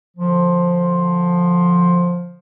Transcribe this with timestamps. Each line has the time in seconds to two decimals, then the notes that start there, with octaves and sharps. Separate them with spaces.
0.17 D3 F3